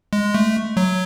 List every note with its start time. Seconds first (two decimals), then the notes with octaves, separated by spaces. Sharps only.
0.13 G#3
0.34 A3
0.77 F#3